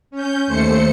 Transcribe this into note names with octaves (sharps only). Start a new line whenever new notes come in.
C#4 G6
D#2 A3 C5 C#7